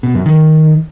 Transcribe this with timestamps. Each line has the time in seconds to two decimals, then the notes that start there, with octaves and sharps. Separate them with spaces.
0.03 B2
0.15 F#2
0.26 D#3